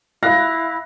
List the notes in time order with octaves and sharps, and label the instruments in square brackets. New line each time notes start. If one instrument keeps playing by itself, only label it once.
[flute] E4 [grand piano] F5 F#6 [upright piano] A#6